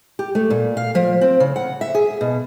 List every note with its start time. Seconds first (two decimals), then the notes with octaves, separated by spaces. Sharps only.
0.19 G4
0.35 A3
0.50 A#2
0.77 F5
0.95 F3
1.21 C4
1.40 C#3
1.56 F#5
1.81 E5
1.95 G#4
2.21 B2